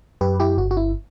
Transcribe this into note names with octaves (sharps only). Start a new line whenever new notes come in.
F#2 G4 B4
E4 G4
G1 F#4
F#4
E4